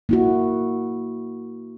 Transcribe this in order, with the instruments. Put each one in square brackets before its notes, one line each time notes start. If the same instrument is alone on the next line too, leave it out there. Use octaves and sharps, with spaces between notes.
[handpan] A#3 E4 F#4